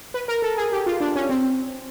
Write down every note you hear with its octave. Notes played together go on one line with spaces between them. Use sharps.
B4
A#4
A4
G#4
G4
F4
D4
C#4
C4